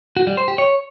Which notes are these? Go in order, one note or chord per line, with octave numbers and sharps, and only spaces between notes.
F#4
G3
C5
G4
C#5